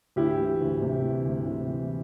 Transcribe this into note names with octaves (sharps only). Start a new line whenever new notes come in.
D2 E4 G4
E3
D2
C3
E3
D2
C3
E3